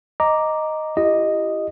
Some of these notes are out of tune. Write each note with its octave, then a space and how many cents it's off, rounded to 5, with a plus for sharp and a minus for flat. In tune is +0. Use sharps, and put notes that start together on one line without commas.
D#5 +0 A#5 +0 D6 +0
E4 +30 G4 +0 D#5 -5